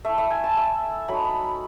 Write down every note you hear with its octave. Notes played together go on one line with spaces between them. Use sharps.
A3 E4 E5
E5
G#5
A5
E5
F#3 A3 D#4 B5
B5